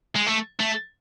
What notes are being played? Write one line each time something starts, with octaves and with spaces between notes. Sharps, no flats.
G#3
A3
A3